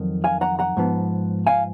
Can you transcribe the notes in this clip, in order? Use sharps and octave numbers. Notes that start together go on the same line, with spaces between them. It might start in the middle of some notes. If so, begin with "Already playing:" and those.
Already playing: F2 D#3 F#3
F5 G#5
F#5 A#5
F#5 A#5
G#2 F3 B3
F5 G#5